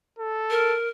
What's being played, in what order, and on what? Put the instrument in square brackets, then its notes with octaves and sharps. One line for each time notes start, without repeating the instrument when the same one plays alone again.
[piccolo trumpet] A4
[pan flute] A#4